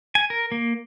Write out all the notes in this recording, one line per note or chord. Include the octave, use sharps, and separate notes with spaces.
G#5
A#4
A#3